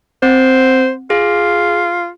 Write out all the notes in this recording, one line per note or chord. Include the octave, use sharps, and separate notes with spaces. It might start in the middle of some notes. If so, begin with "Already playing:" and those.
C4 C5
F4 G#4